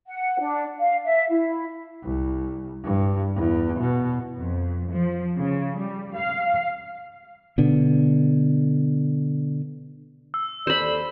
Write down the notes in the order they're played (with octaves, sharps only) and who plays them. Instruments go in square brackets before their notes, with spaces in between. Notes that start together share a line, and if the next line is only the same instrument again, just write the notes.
[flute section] F#5
D4
F5
E5
E4
[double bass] C2
G2
E2
B2
[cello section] F2
F3
C#3
G3
F5
[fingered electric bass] B2 D3
[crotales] E6
[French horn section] D#2 A4 D5 [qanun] C5 B5